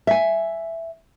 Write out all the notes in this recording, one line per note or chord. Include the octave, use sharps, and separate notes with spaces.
E5 G#5